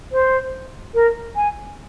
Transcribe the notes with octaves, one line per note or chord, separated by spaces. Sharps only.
C5
A#4
G#5